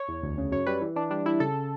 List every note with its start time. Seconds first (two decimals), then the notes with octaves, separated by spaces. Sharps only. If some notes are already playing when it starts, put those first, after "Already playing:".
Already playing: C#5
0.08 E2
0.23 D2
0.38 C#3
0.52 F#2 C#5
0.66 G3 B4
0.81 E3
0.96 E3 D4
1.10 G3 D4
1.25 G3 E4
1.40 C#3 A4